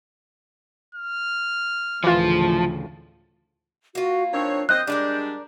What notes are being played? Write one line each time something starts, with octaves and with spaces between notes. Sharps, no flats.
F6
D2 A2 C#3 E3 F3 F4
A#3 F4 F#4
D#3 C4 D4 C#5
C4 C5 D#5 F#6 G6
G3 G#3 D4 A#4 B4 D5